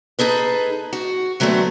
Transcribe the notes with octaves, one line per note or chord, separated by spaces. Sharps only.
D#4 G#4 A4 B4
F#4
D3 F#3 A3 B3 C4